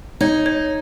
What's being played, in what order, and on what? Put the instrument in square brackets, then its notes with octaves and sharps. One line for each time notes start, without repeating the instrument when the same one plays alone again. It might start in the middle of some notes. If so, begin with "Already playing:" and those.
[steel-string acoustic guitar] D#4 [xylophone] C#5
[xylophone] C#5